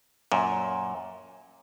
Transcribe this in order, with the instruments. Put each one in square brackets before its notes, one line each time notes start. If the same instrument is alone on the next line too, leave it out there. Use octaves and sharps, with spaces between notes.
[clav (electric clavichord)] F#2 A#2